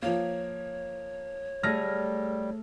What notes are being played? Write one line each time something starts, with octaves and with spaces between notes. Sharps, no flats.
F3 A#3 C#5
G3 A3 G#4 F6 A#6